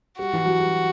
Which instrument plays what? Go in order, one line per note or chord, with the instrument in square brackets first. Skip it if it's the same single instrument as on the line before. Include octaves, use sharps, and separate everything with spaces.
[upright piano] G3 [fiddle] F#4
[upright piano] E3
F#3
G3